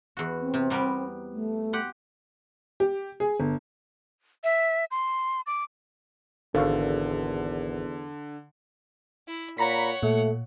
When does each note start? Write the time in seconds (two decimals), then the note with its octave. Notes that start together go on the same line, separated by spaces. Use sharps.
0.17 E2 F#4
0.40 C4
0.54 C3
0.70 G3 B3 A#4
1.32 A3
1.73 G4 F#5 C6
2.80 G4
3.20 G#4
3.40 G1
4.44 E5
4.91 C6
5.46 D6
6.55 G#1 E2 D3 A4 F5 C#6
9.28 E4
9.58 A#2 C#5 F#5 A#5 B5 B6
10.03 A#2 A3